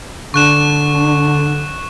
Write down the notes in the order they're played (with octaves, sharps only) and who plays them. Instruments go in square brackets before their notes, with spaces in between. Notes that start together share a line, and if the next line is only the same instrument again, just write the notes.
[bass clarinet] D3 [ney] D4 [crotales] C#6 F#6 E7